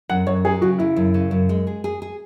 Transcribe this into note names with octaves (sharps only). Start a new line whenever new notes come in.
F#2 F#5
F#2 C#5
F#3 G#4
C#3 F#4
C#3 E4
F#2
C#3
F#2
G#3
G#4
G#4
G#4